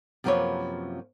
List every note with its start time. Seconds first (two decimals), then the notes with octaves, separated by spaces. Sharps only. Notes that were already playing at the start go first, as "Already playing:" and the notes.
0.24 F#2 C3 F3 A#3 B4 C#5